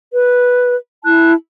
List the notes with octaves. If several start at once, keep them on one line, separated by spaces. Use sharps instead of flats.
B4
E4 A5 F#6